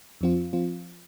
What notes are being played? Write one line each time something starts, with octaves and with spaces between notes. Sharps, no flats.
F2 F3 C4 F4
F3 C4 F4